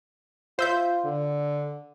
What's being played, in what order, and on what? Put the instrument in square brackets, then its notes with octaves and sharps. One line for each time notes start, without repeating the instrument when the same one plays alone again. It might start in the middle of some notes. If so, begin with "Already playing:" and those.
[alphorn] F4 [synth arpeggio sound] C5 E5 G6
[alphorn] D3